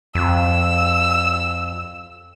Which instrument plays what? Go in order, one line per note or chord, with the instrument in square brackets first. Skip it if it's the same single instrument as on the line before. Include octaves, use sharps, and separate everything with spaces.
[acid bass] F2 [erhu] E6